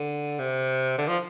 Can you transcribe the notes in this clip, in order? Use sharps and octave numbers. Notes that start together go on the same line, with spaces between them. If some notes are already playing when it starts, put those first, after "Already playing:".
Already playing: D3
C3
D3
F3